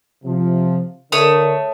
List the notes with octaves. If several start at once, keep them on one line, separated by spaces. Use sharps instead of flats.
C3 F3
D3 A3 A#4 C#5 D#6